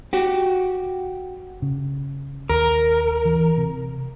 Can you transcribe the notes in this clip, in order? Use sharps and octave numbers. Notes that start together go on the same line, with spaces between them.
F#4 G4
C#3
D#2 A#4
E3
C3